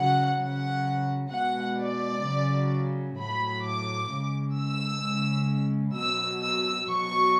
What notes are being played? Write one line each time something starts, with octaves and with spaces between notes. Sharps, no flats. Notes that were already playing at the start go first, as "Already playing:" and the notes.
Already playing: C#3 F#3 F#5
C#3 F#3 F#5
B2 G#3 F#5
D5
C#3 F#3
A2 F#3 B5
D6
C#3 G#3
E6
C#3 G#3
B2 F#3 E6
E6
B2 F#3 C#6